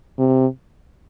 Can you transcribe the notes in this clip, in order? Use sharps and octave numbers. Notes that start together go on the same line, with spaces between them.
C3